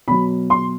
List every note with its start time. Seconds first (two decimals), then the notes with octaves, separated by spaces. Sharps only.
0.07 B2 F#3 B5
0.50 C6